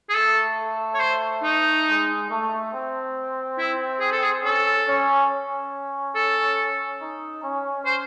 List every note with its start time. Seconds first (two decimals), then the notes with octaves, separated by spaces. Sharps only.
0.10 G#4
0.15 A3 A4
0.94 C#5
1.00 C5
1.43 D#4
1.87 G#3
2.29 A3
2.72 C4
3.58 E4
4.00 G#4
4.12 A4
4.23 G#4
4.44 C#4 A4
4.87 C#4
5.29 C#4
6.15 A4
7.01 D#4
7.43 C#4
7.86 C5